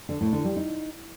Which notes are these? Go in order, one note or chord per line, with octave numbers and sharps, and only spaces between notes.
D3
A2
D3
G3
D#4